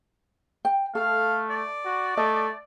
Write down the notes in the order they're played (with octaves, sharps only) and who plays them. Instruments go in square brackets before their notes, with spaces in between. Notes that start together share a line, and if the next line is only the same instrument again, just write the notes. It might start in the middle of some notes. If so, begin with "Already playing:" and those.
[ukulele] G5
[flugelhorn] A3 [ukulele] A4 [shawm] F5
[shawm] D5
[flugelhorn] F#4
[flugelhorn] A3 [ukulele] D#5